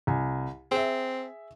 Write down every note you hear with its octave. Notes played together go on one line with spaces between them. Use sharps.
C2 G#5
C4 G#4 E5